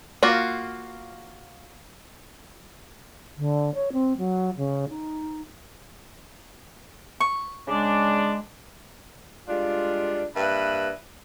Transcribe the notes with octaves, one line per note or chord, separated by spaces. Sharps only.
A#3 F4 F#4
D3
C#5
C4
F#3
C#3
D#4
C#6
C#3 G#3 D4
G3 G#3 D4 F4
G2 A#3 B4 E5 B5